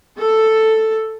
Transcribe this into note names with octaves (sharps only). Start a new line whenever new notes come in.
A4